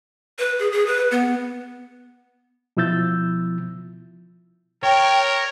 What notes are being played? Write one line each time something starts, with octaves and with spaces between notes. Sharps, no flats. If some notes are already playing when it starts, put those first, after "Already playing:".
B4
G#4
G#4
B4
B3
B2 F3 E4 E6 G6 A6
A#4 C#5 G5